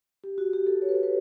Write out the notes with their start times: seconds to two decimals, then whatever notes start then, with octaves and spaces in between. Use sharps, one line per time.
0.24 G4
0.38 F#4
0.53 G4
0.67 A4
0.82 C#5
0.89 B4
0.95 A4
1.03 B4